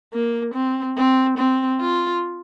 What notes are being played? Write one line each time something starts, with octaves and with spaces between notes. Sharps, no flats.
A#3
C4
C4
C4
F4